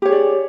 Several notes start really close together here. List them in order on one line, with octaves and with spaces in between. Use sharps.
G4 C#5 G#4 D5